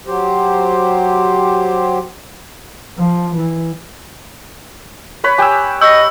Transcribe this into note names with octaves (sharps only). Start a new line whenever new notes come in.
F#3 G4 C5
F3
E3
B4 C#5 B5
G4 G5 G#5 E6
D#5 C#6 E6 G6